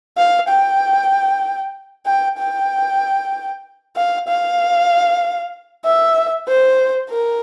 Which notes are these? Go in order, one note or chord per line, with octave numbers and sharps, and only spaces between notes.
F5
G5
G5
G5
F5
F5
E5
C5
A#4